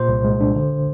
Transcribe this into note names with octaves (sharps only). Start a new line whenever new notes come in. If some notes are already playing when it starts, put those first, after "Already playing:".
Already playing: A#2 C5
C2
G#3
D4
D3